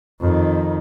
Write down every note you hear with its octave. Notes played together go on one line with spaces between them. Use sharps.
F2 D#3